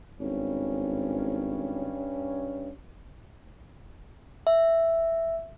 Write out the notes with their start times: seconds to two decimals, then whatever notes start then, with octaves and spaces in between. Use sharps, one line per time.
0.20 G#1 G2 C#4
4.47 E5